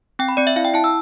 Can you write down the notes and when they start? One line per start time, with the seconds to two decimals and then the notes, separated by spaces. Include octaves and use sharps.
0.19 C4 G5
0.29 B5
0.37 C4 D5
0.47 E5
0.56 E4 F5
0.65 G5
0.74 E4 A5
0.84 E6